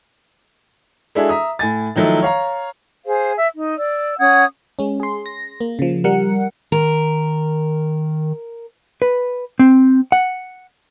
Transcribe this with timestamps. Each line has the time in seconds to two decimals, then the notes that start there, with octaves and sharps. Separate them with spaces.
1.15 G#3 D4 E4 F#4 G#4 A4
1.29 E5 A#5 D#6
1.59 A2 G#5 A6
1.96 D#3 F3 F#3 A3 D#4 E4
2.22 C#5 F5 A#5
3.06 G#4 C5 F5
3.37 E5 E6
3.54 D#4
3.79 D5 E6
4.20 C#4 F#5 D#6 G#6
4.79 G#3 C#4
5.00 G#4 C6
5.26 A#6
5.60 A#3
5.79 C#3 F3
6.04 G3 A#4 F#5 C#7
6.72 D#3 A#4
9.02 B4
9.59 C4
10.12 F#5